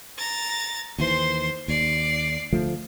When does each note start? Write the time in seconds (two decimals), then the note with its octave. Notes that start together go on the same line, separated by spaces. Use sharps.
0.18 A#5 A6
0.98 D#2 E3 C5 C6
1.68 D#2 D5 C7
2.53 D2 F3 A3